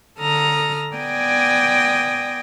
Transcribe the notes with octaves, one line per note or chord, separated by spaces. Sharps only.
D3 A4 A#5 D#6 F6
B3 D5 G5 G#5 D#6 A#6